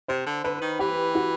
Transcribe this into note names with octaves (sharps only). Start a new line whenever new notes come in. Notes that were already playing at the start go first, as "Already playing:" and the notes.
C3 C5
D3
D3 B4
D#3
E3 G4
F#4